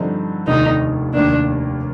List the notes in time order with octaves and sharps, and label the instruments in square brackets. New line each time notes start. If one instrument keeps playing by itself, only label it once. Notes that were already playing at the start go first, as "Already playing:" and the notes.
Already playing: [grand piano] G2 D3 F3 C4 D#4
[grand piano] F1 D#2 D3 [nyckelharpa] D#4
[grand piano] F1 D#2 D#3 A#3 [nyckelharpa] D4